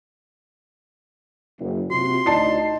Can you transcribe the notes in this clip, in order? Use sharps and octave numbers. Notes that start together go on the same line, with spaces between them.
F#1
C3 F4 F#4 C6
D2 D#4 E4 D5 A5 C7